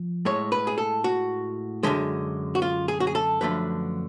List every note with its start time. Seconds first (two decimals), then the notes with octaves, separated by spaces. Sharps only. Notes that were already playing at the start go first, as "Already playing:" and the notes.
Already playing: F3
0.25 A2 G#3 C#5
0.52 B4
0.67 G#4
0.78 A4
1.04 F#4
1.83 F#2 D3 G#3
2.55 F#4
2.62 F4
2.88 G#4
3.00 F#4
3.07 G#4
3.15 A4
3.41 F#2 D3 F3 A3 B4